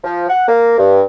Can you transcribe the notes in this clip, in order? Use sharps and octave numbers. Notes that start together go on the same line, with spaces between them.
F3
F#5
A#3
G2